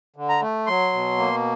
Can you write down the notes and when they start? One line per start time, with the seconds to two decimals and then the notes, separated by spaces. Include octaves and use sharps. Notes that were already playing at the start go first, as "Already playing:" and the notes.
0.16 D3
0.29 A#5
0.42 A3
0.67 F#3 C6
0.93 B2
1.18 A#3